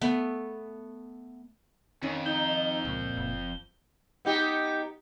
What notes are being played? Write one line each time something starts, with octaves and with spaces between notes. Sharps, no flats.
A3 B3
F2 D#3 C#4
D#4 G6 G7
C#2 A#2
F#1
B3 D#4 G4